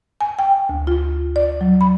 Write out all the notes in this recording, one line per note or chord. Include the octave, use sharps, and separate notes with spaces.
G#5
G5
D2
F4
D5
F#3
B5